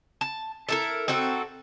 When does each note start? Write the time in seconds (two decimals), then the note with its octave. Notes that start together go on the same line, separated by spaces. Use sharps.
0.21 A5
0.69 E4 A4 A#4
1.08 C4 D#4 F#4 A4